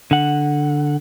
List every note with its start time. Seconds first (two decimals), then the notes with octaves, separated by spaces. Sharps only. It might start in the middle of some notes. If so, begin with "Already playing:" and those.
0.11 D3 F#5